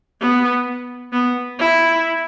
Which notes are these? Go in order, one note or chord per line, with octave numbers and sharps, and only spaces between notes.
B3
B3
E4